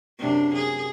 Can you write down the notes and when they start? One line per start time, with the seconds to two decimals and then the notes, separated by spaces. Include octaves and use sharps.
0.19 F#2 C3 D4
0.55 G#4